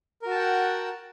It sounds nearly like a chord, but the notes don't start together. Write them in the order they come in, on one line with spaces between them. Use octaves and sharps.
A#4 F#4 A5 G5 F#5